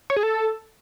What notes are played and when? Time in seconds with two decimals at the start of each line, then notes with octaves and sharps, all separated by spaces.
0.10 C#5
0.16 G#4
0.23 A4